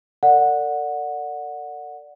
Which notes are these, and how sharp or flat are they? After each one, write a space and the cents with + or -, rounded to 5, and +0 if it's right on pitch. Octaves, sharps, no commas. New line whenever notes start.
A4 +45 D5 +0 F#5 -15